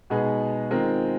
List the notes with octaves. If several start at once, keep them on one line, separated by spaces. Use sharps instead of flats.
B2 G#3 B3 D#4 G#4
D#3 G#3 C4 F4 A#4